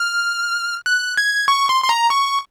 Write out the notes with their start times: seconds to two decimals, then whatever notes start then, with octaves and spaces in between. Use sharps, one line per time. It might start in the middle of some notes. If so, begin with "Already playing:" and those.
Already playing: F6
0.86 F#6
1.17 G#6
1.48 C#6
1.69 C6
1.84 C6
1.89 A#5
2.10 C#6